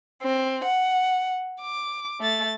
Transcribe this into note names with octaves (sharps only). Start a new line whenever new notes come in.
C4
F#5
D6
A3 A6